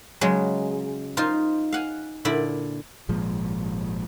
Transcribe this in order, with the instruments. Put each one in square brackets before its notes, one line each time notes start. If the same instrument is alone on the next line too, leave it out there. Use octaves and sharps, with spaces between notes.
[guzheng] C#3 F#3 G#3
D#4 F4 C5
F5 F#5 G#5
A#2 D3 E4 D5
[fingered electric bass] G#1 A#2 F3 G#3